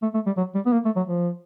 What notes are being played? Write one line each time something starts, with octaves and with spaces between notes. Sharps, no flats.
A3
A3
G3
F#3
G3
B3
A#3
A3
F#3
F3